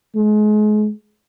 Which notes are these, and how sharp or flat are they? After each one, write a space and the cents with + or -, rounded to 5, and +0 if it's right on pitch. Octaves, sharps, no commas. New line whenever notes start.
G#3 +35